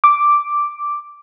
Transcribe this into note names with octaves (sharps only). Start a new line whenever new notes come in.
D6